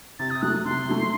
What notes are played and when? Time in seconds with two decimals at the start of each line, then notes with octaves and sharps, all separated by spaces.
0.19 C3 A6
0.30 D#6
0.42 F#3 A3 F#6
0.65 C3 C6
0.88 F#3 A3